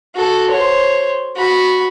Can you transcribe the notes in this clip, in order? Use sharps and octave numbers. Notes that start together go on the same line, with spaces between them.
F#4 A4
C5 C#5
F#4 B5